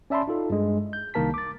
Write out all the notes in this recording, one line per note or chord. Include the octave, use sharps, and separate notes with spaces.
C#4 D5 E5 A5 B5 C6
D#4 F4 A4
G2 G#3
G6
C2 D#3 A#3 A#4 A5 B6
D6 A6